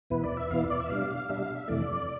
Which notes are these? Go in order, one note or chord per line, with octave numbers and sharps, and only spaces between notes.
E2 B2 B3 E4 B4
D5
E5
E2 B2 B3 E4 F5
D5
E5
B2 G3 D4 F5
B2 G3 D4 E5
F5
E5
F2 C3 E3 A3 D5